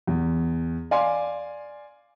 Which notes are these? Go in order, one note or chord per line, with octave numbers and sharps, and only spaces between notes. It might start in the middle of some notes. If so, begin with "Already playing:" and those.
E2
D5 F5 G#5 C6